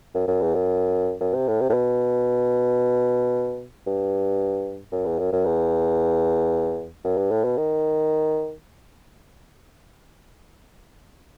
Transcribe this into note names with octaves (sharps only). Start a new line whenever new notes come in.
F#2
F#2
E2
F#2
F#2
C3
A2
C3
A2
B2
G2
F#2
E2
F#2
F#2
E2
F#2
G2
A2
B2
D#3